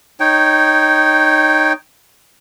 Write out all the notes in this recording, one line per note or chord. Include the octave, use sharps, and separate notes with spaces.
D#4 C#5 G5